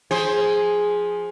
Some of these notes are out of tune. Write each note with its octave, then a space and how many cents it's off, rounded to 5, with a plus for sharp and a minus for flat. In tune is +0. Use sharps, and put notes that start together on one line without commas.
F3 +25 G#4 +0 C5 +5